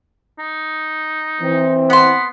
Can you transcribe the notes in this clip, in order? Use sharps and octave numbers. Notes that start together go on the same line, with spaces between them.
D#4
E3 C4
B3 F#5 C6